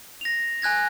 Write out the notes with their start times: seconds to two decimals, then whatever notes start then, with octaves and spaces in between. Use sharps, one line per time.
0.21 A#6 F7
0.62 G#5 F#6 G#6 A#6